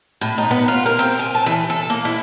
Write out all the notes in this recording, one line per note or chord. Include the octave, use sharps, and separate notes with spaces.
A2
D#4
B3
F4
A#4
C4
G#5
A5
E3
A4
A#3
E4